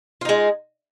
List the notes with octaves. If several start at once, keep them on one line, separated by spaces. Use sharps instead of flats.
G#3 D#4 F4